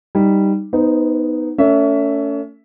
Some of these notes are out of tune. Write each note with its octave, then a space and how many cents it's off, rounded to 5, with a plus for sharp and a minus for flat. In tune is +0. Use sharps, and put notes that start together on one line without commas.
G3 +0 D#4 +0
B3 +0 D#4 +0 C5 -25
A3 +35 C#4 +35 E5 +0